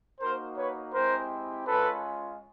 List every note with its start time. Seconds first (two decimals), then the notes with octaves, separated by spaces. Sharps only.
0.20 A#3 D#4 F#4 A#4 C5
0.57 B4 C#5
0.94 G#3 C4 E4 G4 A#4 C5
1.67 G#3 C#4 F4 A4 B4